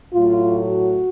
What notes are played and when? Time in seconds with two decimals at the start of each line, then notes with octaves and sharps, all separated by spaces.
0.14 A2 F#3 A3 F4
0.69 F#4